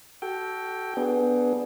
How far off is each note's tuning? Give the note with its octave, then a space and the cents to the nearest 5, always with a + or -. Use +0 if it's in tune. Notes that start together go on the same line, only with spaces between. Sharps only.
F#4 +30 A4 -10 G5 +10
B3 +0 D4 +0 G#4 +20